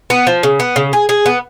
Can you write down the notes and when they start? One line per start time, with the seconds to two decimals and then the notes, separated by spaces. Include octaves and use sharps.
0.10 B3
0.27 F3
0.43 C#3
0.60 B3
0.76 C#3
0.93 G#4
1.09 G#4
1.26 B3